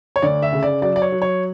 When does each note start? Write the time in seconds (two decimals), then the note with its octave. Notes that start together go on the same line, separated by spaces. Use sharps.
0.16 C#5
0.22 D2 D5
0.42 E5
0.53 C#3
0.63 D5
0.82 F#3 D5
0.96 D5
1.02 C#5
1.12 F#3
1.22 C#5